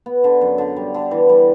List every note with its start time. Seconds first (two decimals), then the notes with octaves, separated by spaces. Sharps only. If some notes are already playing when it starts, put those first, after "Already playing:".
0.06 B3
0.24 D3
0.41 F#2
0.58 D3
0.76 G3
0.94 D3
1.11 E3
1.29 G3